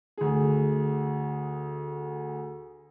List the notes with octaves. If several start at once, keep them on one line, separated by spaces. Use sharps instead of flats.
D2 G#4